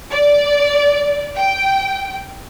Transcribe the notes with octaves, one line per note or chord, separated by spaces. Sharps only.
D5
G5